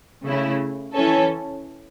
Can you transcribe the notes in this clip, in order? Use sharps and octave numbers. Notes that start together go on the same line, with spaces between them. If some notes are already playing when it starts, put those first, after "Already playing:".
C#3 A3 E4
E3 C#4 A4